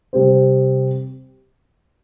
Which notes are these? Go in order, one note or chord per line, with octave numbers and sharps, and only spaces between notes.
C3 G3 C4 G4 C5